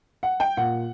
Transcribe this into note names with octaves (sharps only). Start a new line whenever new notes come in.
F#5
G5
A#2 F#5